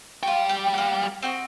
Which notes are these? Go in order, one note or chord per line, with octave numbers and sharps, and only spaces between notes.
G3 F4 F#4 G5
G4
A#3 F#5
C4 F#4 D#5